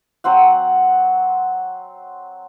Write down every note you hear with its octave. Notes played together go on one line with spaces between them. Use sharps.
F#3 C4 C5 F#5